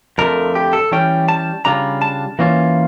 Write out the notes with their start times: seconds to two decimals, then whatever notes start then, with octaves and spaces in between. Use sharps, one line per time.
0.18 F2 D3 F3 A3 A#4
0.55 G4
0.73 A4
0.92 E3 G3 C#4 G5
1.29 A5
1.65 C#3 G3 D4 F4 A#5
2.02 A5
2.39 E3 A#3 C#4 F4